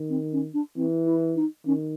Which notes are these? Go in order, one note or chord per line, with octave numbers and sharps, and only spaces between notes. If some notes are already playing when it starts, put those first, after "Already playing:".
Already playing: D#3
C4
C#4
D4
E3 C4
E4
D#4
D#3 C#4